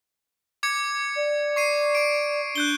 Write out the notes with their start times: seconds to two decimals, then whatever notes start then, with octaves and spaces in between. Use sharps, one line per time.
0.63 D6 G#6 C#7
1.16 D5
1.56 C#6 C7 D#7
1.95 C#6 D7
2.56 D4 F#6 G6 G7